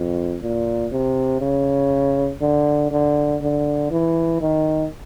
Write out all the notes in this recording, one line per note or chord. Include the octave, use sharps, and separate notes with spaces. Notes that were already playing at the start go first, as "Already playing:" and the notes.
Already playing: F2
A#2
C3
C#3
D3
D3
D3
E3
D#3